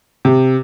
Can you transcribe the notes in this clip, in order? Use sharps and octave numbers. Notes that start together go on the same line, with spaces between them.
C3